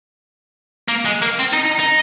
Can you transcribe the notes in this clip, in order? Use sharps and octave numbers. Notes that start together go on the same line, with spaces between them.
A#3
G#3
A#3
C4
D#4
D#4
D#4